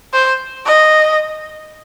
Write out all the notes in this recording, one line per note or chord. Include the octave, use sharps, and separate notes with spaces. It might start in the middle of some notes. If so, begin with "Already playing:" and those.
C5
D#5